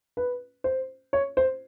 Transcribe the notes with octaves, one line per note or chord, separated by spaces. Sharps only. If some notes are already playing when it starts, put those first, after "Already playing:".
B4
C5
C#5
C5